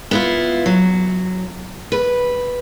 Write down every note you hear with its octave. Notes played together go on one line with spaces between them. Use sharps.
B3 E4 F4
F#3
B4